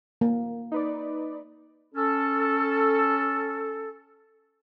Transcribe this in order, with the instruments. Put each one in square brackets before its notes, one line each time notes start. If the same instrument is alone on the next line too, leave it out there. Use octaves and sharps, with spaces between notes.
[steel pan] A#3
[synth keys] D#4 B4 D5
[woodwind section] C#4 A4